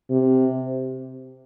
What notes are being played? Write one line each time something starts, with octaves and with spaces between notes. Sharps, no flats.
C3